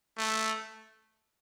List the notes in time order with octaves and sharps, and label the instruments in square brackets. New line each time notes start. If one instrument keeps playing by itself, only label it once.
[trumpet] A3